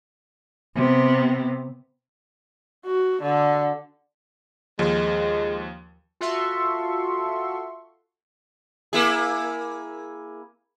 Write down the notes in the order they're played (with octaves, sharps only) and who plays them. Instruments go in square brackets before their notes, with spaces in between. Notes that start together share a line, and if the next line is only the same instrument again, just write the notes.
[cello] C3 B3
[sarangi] F#4
D3
[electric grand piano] D#2 F3 [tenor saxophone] G#3
[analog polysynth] F4 F#4 A4 E5 C6 C#6
[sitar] A#3 E4 G#4